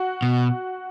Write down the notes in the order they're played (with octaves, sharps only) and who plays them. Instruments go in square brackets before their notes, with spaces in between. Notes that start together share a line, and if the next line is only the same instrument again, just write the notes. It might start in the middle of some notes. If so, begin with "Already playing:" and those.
Already playing: [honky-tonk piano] F#4
[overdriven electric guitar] B2